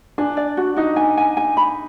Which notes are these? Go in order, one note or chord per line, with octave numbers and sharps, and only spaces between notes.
D4 G#5
D5
F#4
D#4 F#4
G#5
G#5
G#5
B5